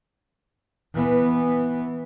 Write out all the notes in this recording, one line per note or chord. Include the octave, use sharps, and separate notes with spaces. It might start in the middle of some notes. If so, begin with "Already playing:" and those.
E3 B3